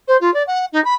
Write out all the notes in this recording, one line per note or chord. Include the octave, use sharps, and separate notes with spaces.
C5
F4
D5
F#5
D#4
B5